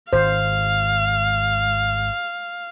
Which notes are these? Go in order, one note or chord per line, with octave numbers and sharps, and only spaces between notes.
G#1 C5 F5